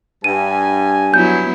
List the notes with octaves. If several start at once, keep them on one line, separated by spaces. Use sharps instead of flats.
G2 G#5 D#7
F#3 B3 E4 G6